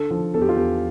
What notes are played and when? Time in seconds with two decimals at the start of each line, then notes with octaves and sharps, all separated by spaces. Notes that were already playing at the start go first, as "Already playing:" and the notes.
Already playing: D3 A4
0.11 F3
0.34 E2 A4
0.42 G4
0.49 F4
0.57 E2 G4